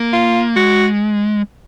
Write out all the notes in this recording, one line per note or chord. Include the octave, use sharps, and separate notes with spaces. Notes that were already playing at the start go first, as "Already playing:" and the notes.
Already playing: A#3
F4
G#3 F#4